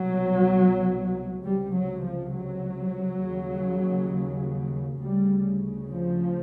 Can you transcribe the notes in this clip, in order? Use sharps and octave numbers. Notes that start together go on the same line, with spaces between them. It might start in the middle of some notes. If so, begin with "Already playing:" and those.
Already playing: C2 B2 F#3
C#2 C3 G3
F#3
F3
F#3
D#2 C#3
D2 C#3 G3
F3